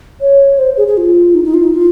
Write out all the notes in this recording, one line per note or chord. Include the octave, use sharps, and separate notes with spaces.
C#5
C5
G#4
G#4
F4
D#4
D#4
F4
D#4
F4